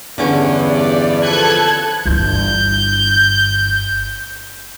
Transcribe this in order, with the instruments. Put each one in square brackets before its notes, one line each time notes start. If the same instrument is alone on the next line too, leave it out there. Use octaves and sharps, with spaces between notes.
[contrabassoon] E2 [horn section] G2 [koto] D3 C#4 G#5
[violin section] D5
[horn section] F3 B4 [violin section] A4 F#6 G#6
[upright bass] G1 E3 [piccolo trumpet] G6